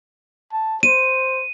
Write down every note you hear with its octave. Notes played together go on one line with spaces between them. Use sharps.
A5
C5 D#7